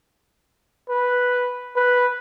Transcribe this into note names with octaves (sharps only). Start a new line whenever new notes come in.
B4
B4